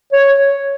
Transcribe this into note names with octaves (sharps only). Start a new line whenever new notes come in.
C#5